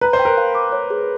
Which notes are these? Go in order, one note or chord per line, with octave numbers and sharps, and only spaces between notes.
B4 A#5
C5
G5
A#4
F5
D6
C#5
G#4